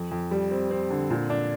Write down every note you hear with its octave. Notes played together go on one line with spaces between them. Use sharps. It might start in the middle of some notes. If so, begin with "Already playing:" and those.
Already playing: F2
F2
G3
C4
C4
D3
A#2
D4